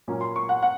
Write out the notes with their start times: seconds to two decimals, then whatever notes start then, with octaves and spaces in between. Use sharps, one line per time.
0.08 A#2 F#3 A#3 C#4
0.21 C6
0.36 C#6
0.49 F#5
0.63 F#5